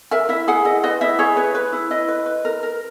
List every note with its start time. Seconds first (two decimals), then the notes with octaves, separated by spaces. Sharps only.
0.11 A#4 E5
0.29 E4 E5
0.48 G#4 F#5
0.65 E4 D#5
0.84 B4 D#5
1.01 E4 E5
1.19 G#4 C#5
1.37 B4 C#5
1.55 B4
1.72 E4
1.91 E4 D#5
2.08 B4
2.26 B4
2.45 A#4
2.63 A#4